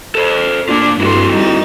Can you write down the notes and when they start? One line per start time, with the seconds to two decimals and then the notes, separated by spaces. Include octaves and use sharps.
0.15 A4 A#4 C5
0.69 A#3 D4 F4
1.01 G2 E4 F#4 A4 C6
1.32 G3 D#4